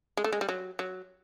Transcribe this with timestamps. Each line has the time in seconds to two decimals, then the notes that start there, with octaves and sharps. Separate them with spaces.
0.17 G#3
0.24 A3
0.32 G#3
0.41 G3
0.49 F#3
0.79 F#3